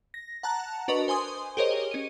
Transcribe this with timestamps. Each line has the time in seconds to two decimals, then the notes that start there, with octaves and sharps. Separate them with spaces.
0.14 A#6
0.43 F#5 A5 A#5 F#6
0.88 D4 F#4 A#4 B4 D#5 C#6
1.08 C5 G#5 C6 D#6
1.57 G4 G#4 A#4 C5 C#5 D#5
1.91 C#4 D#7